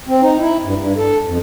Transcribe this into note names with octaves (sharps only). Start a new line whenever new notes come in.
C4
D#4
E4
G2
G2
A4
F2